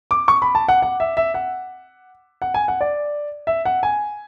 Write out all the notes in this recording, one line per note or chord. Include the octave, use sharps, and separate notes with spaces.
D6
C#6
B5
A5
F#5
F#5
E5
E5
F#5
F#5
G#5
F#5
D5
E5
F#5
G#5